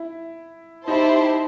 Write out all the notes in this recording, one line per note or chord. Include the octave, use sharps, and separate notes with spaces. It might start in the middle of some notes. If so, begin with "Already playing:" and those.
Already playing: E4
D#4 E4 G4 C5 E5 A5